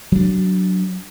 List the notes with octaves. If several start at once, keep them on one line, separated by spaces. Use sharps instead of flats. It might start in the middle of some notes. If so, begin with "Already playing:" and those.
F#3 D4